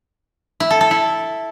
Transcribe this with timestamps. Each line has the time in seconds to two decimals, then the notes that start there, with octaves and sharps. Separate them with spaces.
0.60 E4
0.71 A4
0.81 A4
0.91 E4